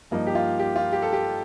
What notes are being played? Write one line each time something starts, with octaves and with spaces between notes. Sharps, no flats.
G2 F3 A#3 D#4
G4
F4
G4
F4
G4
A4
G4